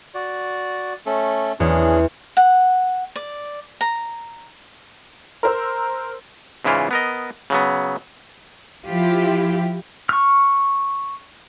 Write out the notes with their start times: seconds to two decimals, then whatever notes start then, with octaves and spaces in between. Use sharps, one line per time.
0.14 F#4 D5
1.06 A3 C#4 A4
1.60 E2 C#4 D4 G#4
2.37 F#5
3.16 D5
3.81 A#5
5.43 A#4 C5 E6
6.65 G#2 C#3 E3 E4 F4
6.91 B3 A#4 D#5
7.50 C#3 F#3 B3
8.86 F3 E4 F4 G4
10.09 C#6 F6